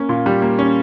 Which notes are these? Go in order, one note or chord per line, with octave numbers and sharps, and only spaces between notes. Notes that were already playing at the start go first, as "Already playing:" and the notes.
Already playing: A#3 C#4
A#2
G3
A#3
C#4